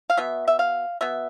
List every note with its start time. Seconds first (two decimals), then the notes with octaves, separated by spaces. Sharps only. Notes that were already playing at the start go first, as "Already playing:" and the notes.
0.10 F5
0.17 B2 B3 E5
0.48 E5
0.59 F5
1.01 B2 B3 E5